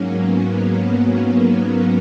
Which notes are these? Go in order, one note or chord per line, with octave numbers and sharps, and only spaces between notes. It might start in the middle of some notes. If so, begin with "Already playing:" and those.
Already playing: G#2 F#3 A#3 C#4
B3
B3
C#4
C#4